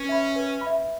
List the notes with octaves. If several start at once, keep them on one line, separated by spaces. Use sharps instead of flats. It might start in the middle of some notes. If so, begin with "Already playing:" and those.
Already playing: C#4 B4
E5 B5
B4
B5
E5